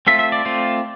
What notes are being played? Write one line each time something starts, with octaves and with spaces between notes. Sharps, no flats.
A3 C4 F4 E5
E5
D5
A3 C4 F4